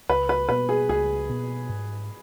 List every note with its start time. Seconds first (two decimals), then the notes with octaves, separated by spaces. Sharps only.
0.09 C#2 B4
0.29 B4
0.49 B2 B3 B4
0.69 G#4
0.89 C#2 G#4
1.30 B2 B3
1.69 G#2